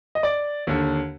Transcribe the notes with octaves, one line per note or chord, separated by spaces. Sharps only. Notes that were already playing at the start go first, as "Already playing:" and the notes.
D#5
D5
D#2 D3